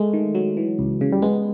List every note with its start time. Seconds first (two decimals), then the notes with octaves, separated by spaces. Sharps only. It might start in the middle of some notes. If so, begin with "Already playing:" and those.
Already playing: G#3 A3
0.13 D#3
0.35 F#3
0.57 E3
0.79 C#2
1.01 C#3
1.12 G3
1.22 G#3 B3